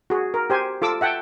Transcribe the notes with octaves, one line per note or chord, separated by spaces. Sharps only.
F#4 G#4
A#4
G4 C5 G#5
F4 A4 D6 E6
E5 F#5 G5 A5